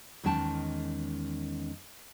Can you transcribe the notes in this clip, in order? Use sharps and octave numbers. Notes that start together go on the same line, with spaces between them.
E2 D#3 G#3 C#4 G5 A5